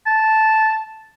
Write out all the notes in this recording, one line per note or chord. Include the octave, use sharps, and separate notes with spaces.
A5